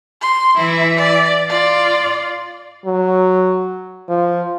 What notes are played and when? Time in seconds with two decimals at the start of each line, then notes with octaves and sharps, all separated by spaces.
0.22 C6
0.57 E3 E4 E5
0.97 D5
1.49 F4 D5
2.85 F#3
4.09 F3